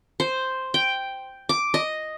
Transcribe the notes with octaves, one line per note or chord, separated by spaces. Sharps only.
C5
G5
D6
D#5